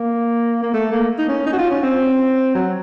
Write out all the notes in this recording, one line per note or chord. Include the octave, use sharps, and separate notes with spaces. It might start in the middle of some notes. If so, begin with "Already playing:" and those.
Already playing: A#3
A#3
A3
A#3
D#4
C#4
D#4
F#4
F4
C#4
C4
F#3